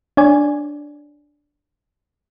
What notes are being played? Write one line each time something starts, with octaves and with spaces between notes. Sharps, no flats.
D4 C#5 D5 G#5